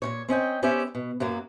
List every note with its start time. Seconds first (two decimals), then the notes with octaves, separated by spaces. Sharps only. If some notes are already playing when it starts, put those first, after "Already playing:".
0.02 A#2 C#3 C#5
0.28 C4 C#4 D#5 G5
0.62 B3 C#4 G4 C5 D5 E5
0.95 B2
1.20 F#2 F#3 A#3